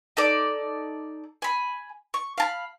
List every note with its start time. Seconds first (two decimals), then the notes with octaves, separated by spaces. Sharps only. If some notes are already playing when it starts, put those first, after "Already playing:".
0.17 D#4 A4 D5
1.42 G#5 B5
2.14 C#6
2.38 F5 A5 B5